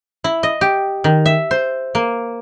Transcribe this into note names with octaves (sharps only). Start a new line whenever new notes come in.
E4
D#5
G4
D#3
E5
C5
A#3